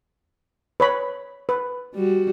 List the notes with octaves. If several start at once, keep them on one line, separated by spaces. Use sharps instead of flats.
B4 C#5 B5
B4
G3 F#4